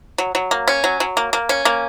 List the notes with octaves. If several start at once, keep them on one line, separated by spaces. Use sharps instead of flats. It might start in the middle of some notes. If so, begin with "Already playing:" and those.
F#3
F#3
A#3
C#4
F#3
F#3
A#3
A#3
C#4
A#3